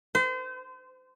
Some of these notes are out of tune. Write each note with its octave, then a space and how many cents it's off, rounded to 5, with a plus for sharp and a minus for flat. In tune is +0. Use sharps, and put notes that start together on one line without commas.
C5 -35